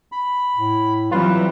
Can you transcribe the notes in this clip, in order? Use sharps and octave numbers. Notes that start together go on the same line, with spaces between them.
B5
A2
E3 F#3 G3 C4 F4 B4